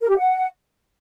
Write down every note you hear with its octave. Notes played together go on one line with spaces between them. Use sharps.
A#4
G4
F#5